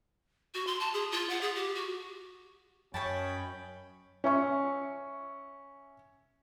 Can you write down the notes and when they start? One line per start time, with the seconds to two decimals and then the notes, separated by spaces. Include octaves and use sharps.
0.54 F#4
0.67 C6
0.80 A5
0.94 G#4
1.12 F4
1.30 F#5
1.41 G#4
1.55 G4
1.75 F#4
2.94 F#2 C#4 C#5 D#5 G5 A5 B5
4.24 C#4 E5 C#6